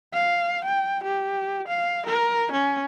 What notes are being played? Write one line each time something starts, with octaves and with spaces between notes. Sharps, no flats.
F5
G5
G4
F5
A#4
C#4